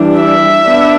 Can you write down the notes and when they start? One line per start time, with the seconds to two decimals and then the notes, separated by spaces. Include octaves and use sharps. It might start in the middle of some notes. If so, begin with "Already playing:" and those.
Already playing: E3 G3 D4
0.18 E5
0.66 B3 D4